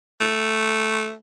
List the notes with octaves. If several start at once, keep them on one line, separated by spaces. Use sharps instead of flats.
A3